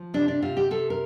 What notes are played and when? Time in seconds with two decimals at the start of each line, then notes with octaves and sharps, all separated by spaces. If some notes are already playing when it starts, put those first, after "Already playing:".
Already playing: F3
0.14 C3 D4
0.28 D4
0.42 C3 F4
0.57 G4
0.71 C3 A4
0.90 A#4